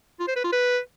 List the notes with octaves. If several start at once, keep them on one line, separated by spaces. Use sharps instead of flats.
F4
C5
B4
F4
B4